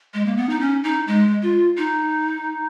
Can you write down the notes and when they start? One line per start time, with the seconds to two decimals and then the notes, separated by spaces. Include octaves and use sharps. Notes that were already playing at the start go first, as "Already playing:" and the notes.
0.14 G#3
0.26 A#3
0.37 B3
0.50 D#4
0.60 C#4
0.84 D#4
1.08 G#3
1.43 F4
1.78 D#4